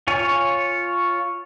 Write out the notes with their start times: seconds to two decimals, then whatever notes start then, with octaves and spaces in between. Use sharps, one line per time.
0.07 F4 C#5 G#5